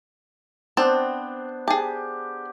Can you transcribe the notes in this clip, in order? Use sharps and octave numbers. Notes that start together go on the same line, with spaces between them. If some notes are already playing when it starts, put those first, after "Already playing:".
B3 C4 D4 C5 A5
G4 G#4 A5